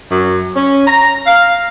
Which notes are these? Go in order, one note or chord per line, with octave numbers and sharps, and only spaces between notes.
F#2
C#4
A#5
F5